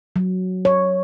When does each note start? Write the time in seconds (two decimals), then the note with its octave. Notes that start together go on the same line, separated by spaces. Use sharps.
0.16 F#3
0.65 C#5